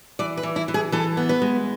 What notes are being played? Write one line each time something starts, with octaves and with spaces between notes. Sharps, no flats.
E3 D5
B4
E3
E4
E3
G#4
E3 A4
B3
B4
G#3